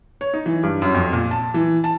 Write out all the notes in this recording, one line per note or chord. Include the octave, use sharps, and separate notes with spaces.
C#5
D#4
E3
G2
F#2
F2
A#2
A5
E3
A5